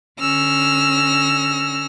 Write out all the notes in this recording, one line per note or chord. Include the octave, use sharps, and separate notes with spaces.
D3 C#4 E6 F6 A#6